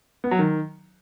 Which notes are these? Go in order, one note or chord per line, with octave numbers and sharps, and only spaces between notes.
B3
F#3
D#3